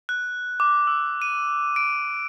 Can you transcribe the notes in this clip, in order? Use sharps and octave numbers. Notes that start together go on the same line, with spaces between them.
F#6
D6
E6
D#7
D7